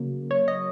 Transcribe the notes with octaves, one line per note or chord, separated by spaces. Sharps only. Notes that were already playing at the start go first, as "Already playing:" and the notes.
Already playing: C#3 F#3 A#3
C#5
D#5